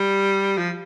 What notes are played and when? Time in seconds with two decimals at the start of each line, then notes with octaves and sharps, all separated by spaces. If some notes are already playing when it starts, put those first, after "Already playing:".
Already playing: G3
0.58 F3